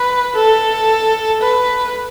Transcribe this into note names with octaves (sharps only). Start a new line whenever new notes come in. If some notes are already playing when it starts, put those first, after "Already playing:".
Already playing: B4
A4
B4